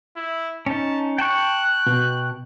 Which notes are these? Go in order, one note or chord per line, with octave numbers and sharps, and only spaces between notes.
E4
C#4 D#4 A5
G5 A5 C#6 F#6
B2